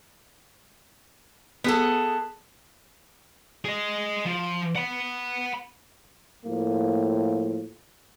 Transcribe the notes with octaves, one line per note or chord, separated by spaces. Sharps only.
B3 G#4 A4
G#4 D#5
F3
F#5 B5
A2 F3 A#3